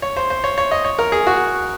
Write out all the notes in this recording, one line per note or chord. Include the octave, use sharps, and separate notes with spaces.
C#5
C5
C5
C#5
C#5
D#5
C#5
A#4
G#4
F#4